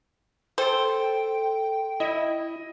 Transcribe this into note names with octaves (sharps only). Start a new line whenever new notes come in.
A4 C5 G5
E4 D#5